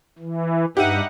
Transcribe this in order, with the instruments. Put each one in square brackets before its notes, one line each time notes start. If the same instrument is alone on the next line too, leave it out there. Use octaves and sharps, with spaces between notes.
[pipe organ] E3
[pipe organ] G2 [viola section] D#4 B4 F#5 [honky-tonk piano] G4 E5 D#7